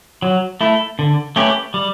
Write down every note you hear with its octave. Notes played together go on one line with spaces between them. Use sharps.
F#3
A3 E4
D3
A3 C#4 G4 B4
G3